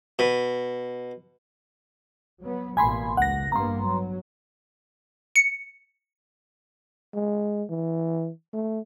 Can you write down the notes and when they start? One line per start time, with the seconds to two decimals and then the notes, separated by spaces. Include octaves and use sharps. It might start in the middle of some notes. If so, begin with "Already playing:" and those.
0.19 B2
2.40 F#3 B3
2.77 A1 B2 A#3 G#5 B5 C6
3.17 C#2 F#5 A#6
3.52 G2 A#3 B3 A#5 C6
3.83 F#3
5.36 C#7
7.14 G#3
7.70 E3
8.54 A3